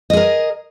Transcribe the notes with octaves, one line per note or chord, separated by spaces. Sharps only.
G#4 A#4 D#5